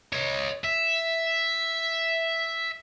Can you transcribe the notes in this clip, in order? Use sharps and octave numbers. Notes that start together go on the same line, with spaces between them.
C#5 D#5
E5